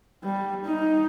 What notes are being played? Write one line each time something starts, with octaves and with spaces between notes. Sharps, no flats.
G3
D#4